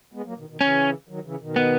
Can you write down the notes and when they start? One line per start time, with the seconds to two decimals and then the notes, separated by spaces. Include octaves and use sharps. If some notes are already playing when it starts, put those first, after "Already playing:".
0.13 G#3 B3
0.25 F#3 A#3
0.37 B2 D#3
0.48 B2 D#3
0.60 C#3 E3 C#4
1.09 D#3 F#3
1.24 C#3 E3
1.40 B2 D#3
1.56 B3